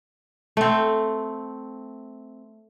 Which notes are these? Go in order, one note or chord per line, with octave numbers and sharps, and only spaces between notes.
A3 C4